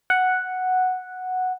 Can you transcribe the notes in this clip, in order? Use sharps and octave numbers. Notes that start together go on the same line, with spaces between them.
F#5